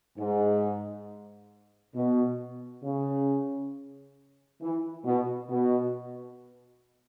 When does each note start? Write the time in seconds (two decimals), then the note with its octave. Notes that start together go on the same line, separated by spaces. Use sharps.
0.18 G#2
1.95 B2
2.84 C#3
4.62 E3
5.05 B2
5.50 B2